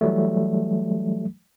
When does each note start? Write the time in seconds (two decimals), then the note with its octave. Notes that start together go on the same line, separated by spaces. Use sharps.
0.01 E3 F#3 G3 A3